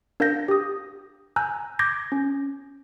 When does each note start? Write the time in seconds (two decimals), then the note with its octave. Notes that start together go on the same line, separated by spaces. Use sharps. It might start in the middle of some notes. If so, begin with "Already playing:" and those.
0.20 D4 A#4 F5 F#5 G6 A#6
0.48 G4 D#6
1.36 G#5 A#5 E6 F#6 G6
1.79 D6 G6 G#6 A#6
2.12 C#4